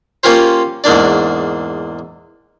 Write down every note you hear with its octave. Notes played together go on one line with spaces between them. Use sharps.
A#3 C#4 F4 G4 A#4 C5
E2 G#2 A#3 D4 D5